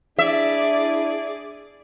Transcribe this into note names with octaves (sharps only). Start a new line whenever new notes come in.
D4 E4 G#4 D5 E5